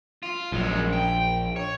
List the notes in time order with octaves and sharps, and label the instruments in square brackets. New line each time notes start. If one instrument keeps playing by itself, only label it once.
[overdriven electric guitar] F4
[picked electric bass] A#1 [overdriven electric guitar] F#2 G#3
[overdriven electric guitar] G5
C#5